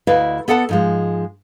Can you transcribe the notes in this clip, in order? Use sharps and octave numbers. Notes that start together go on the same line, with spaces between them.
D2 E4 B4 D5 D#5 F5
B3 A4 D5 F#5 A5
G#2 F3 G#3